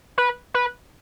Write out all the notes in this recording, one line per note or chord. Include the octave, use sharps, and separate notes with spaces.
B4
B4